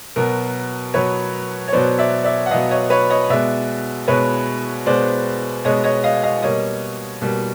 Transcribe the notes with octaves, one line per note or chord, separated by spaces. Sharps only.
B2 F#3 B3 A#4
B2 F#3 B3 B4 C#5
C#5
B2 F#3 B3 C5 D5
D5 E5
D5 E5
F#5
B2 F#3 B3 D#5 F5
C#5 D#5
B4 C#5
C#5 D#5
B2 G#3 B3 D5 E5
B2 G#3 B3 B4 C#5
B2 G#3 B3 C5 D5
B2 G#3 B3 C#5 D#5
C#5 D#5
D#5 F5
D#5 F5
B2 G3 A#3 C#5 D#5
B2 G3 A#3